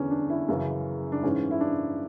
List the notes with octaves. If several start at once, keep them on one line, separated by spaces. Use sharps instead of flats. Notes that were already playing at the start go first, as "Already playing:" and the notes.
Already playing: E2 D3 C#4
D4
E4
F#2 C#3 E3
D4
G#2 E3 C#4
E4
D4